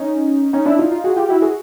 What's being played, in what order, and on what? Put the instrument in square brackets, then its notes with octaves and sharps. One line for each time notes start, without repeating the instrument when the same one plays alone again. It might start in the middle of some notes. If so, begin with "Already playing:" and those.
Already playing: [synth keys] C#4 D#4
C#4 D#4
D4 E4
D#4 F4
D#4 F4
F#4 G#4
F4 G4
E4 F#4
F#4 G#4